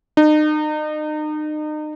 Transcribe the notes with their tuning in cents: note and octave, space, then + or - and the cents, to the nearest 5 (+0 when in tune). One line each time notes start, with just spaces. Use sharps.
D#4 -35